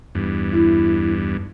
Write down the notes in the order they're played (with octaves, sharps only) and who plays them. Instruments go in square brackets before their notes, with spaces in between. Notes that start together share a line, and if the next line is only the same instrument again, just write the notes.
[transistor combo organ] E2 G2
[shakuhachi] E4